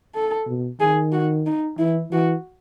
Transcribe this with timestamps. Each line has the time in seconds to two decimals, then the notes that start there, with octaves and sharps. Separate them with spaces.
0.15 A4
0.47 B2
0.80 D#3 G#4
1.12 F#4
1.46 D#4
1.79 E3 E4
2.12 E3 F#4